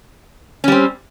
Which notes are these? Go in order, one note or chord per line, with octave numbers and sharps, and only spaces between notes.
G3 C4 C#4